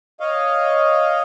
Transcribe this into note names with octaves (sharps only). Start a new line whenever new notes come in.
C#5 D#5 F5